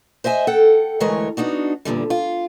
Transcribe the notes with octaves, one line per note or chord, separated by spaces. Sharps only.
C5 D#5 E5 G#5
A4 F#5 G5
D2 E3 G#3 A3 A#4 C#5
B3 D4 D#4 F#4
E2 A#2 D3 G3
F4